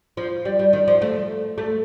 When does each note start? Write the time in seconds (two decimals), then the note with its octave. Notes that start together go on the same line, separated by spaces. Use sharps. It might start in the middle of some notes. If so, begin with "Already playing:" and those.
0.17 F3
0.45 G3
0.59 G3
0.73 D#3
0.88 F3
1.02 A3
1.58 A3